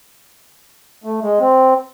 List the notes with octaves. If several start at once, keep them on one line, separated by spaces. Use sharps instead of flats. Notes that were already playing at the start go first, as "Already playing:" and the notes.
A3
G#3
C4